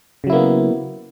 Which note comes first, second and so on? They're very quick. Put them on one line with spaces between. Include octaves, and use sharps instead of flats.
C#3 F#3 E4 A#3 B3